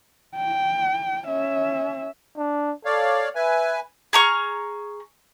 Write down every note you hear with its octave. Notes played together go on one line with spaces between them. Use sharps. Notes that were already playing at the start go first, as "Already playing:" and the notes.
G5
C#4 E5
D4
A4 C#5 D5 F5
B4 E5 G#5
G#4 A#5 C#6 F6